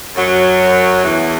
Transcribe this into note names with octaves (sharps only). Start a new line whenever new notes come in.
F#2 F#3
E2 E3